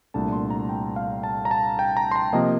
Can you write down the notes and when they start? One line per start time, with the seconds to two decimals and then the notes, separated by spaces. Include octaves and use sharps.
0.14 C2 A#2 A3 D4 A5
0.32 C6
0.50 A#5
0.69 G5
0.96 F5
1.23 A5
1.45 A#5
1.51 A5
1.79 G5
1.97 A#5
2.11 C6
2.16 A#5
2.33 C3 F3 A#3 D#5